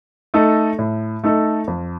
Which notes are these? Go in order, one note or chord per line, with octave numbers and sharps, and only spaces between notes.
A3 D#4 A4
A2
A3 D#4 A4
F2